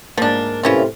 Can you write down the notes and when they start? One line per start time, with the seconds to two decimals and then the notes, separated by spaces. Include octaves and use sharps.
0.17 G#2 F3 A#3 D4
0.63 A2 C3 E3 C#4 F4